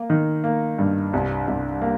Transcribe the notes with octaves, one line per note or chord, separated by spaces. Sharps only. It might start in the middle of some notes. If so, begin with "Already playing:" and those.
Already playing: A#3
D#3
A#3
G2
C2
C2
A#3